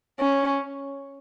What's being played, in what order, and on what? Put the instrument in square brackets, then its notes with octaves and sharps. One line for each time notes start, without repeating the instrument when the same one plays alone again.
[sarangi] C#4